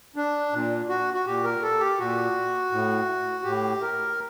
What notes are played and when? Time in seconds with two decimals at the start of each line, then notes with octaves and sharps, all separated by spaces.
0.16 D4
0.53 A#2
0.89 F#4
1.14 F#4
1.26 A#2 G4
1.44 A#4
1.63 A4
1.80 G4
1.99 A#2 F#4
2.72 A2
3.44 A2 G4
3.82 A#4